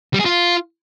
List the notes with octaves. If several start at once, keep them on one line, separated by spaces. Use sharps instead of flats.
G3
G#4
F4